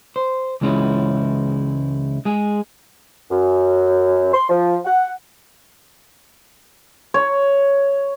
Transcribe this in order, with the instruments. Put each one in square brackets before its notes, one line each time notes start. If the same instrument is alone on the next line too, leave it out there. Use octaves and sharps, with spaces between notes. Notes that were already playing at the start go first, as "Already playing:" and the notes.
[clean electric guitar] C5
C#2 E3 G#3 C#4 D#4 E4
G#3 G#4
[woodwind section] F#2
C6
F3
F#5
[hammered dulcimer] C#5